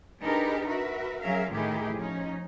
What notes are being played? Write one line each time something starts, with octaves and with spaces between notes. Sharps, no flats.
D4 D#4 G4 G#4 A#4 B4
F#4 A#4 B4 E5
F#3 C#4 G#4 A#4 E5 F5
A2 D#3 A3 E4 G4 G#4
F3 C#4 D#4